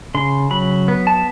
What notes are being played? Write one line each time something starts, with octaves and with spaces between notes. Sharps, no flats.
C#3 C6
F#3 B5
B3
A5